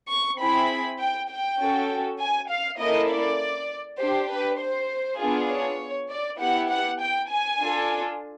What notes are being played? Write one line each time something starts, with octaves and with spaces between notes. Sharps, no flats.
C#6
C4 E4 G#4 B5
G5
G5
C#4 F#4 A4
G#5
F5
A#3 C#4 E4 A4 D#5
D5
D4 G4 C5
B4
C5
B3 D4 F4 G#4
C#5
D5
B3 E4 G4 F#5
F#5
G5
G#5
D4 F4 A4